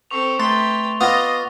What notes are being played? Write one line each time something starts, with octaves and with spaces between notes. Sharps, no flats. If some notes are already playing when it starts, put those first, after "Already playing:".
C4 A4 C#6 F7
A3 G4 B4 C6 A6
B3 F4 D#5 C6 D6 D#6 A6 A#6